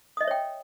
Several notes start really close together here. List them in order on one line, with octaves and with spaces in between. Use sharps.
D#6 D#5 E5 C#5 G5